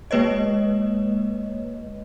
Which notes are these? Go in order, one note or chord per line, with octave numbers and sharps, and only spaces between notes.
G#3 A#3 B4 C#5 D#5